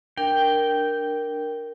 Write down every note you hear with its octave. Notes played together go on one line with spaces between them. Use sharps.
D4 A#4 G5